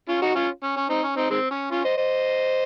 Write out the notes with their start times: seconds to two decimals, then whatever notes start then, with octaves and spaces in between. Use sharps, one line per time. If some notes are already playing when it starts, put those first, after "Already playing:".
0.09 C#4 F4
0.22 D#4 F#4
0.35 C#4 F4
0.63 C#4
0.76 C#4
0.89 C4 D#4
1.03 C#4
1.17 C4 D#4
1.30 D#3 G#3 C4
1.51 C#4
1.71 C#4 F4
1.84 C5 D#5
1.97 C5 D#5